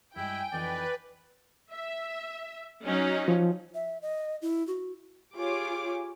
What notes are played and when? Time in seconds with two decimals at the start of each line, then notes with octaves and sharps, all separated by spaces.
0.16 G2 G#3 E4 G5 G#5
0.52 F2 E3 D#4 B4 D5
1.71 E5
2.85 F#3 C#4 D#4
3.28 F3
3.74 E5
4.02 D#5
4.42 E4
4.67 F#4
5.36 F4 G4 G#4 C#5 D6